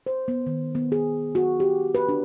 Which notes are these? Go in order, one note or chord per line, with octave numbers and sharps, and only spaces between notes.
C5
B3
D#3
B3
G#4
F#4
G4
B4
D4